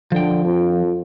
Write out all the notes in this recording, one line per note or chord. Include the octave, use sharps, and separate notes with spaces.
D3 F3 G5
F2